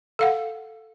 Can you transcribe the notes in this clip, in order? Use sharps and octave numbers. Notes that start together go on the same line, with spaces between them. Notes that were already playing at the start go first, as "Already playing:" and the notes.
A4 F5 F#5